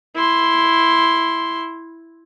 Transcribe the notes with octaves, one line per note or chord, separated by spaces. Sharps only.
E4 C6